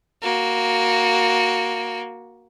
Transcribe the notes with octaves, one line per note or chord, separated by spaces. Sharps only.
A#3 F#4